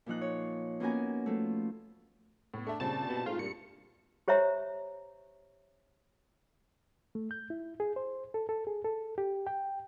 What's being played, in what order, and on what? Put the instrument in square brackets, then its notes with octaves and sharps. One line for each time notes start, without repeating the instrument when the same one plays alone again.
[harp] A#2 F3 D#4 F#6
C#5
A#3 B3 C#4 F#4 A#4 G#5
F3 A3
[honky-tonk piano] A2 B3
[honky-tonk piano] A3 E5 [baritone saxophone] D4
[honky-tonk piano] G2 A#2 C4 [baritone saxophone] C#3 [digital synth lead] A5
[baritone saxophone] B2
[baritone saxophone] G#2 [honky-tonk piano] A3 C4 [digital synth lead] F4
[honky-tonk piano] G2 [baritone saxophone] A#2 [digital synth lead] C#7
[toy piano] G4 C5 C#5 E5 A#5
[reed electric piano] A3
G6
E4
G#4
C5
A4
A4
G#4
A4
G4
G5